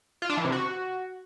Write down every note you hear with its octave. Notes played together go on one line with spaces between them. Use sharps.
F4
D4
E3
C3
F#4